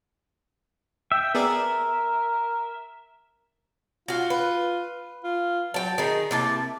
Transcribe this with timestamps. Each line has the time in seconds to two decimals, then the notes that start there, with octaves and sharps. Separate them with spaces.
1.12 E5 G5
1.35 B3 G#4 A#4 D5
4.08 F4 F#4 F5
4.30 B4
5.24 F4
5.74 F#3 G5 A5
5.98 D#3 D#4 G#4
6.31 C3 A#3 E4 A5